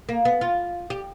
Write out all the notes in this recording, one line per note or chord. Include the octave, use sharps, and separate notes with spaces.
A#3
B3
F4
G4